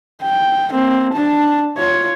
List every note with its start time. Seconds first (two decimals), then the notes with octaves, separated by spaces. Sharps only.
0.23 G5
0.71 A#3 C4
1.13 D4 A5
1.78 F4 C#5